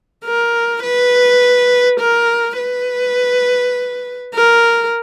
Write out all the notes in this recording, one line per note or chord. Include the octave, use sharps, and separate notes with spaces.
A#4
B4
A#4
B4
A#4